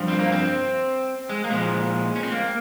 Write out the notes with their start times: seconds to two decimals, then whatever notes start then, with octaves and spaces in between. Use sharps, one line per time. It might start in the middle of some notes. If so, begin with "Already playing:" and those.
Already playing: G2 F3
0.08 C4
0.19 A#3
0.32 C4
1.29 G#3
1.44 A#3
1.50 A#2 F3 G#3
2.16 C#4
2.23 C4
2.32 A#3